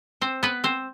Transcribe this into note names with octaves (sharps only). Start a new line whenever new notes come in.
C4 C5
B3 B4
C4 C5